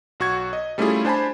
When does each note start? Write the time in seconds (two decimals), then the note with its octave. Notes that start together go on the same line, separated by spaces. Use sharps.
0.20 B1 F#4 C#6 G#6
0.53 D#5
0.78 G3 A3 C#4 E4 F4 G#4
1.05 D4 C5 G#5 A5 B5